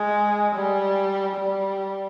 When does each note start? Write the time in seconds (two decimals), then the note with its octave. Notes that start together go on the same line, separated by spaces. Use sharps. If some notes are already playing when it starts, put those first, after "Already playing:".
Already playing: G#3
0.55 G3
1.37 G3